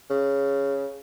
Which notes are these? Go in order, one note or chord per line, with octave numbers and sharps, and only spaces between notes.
C#3